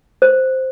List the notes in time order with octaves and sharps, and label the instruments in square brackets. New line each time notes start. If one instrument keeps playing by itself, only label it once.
[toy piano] C5